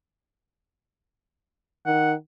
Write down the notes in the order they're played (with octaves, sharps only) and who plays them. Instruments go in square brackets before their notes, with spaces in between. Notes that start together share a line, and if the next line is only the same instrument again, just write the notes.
[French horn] D#3 [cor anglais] F#5